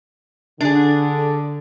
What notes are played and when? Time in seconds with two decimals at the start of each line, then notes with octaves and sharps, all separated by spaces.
0.61 D3 D4 G#4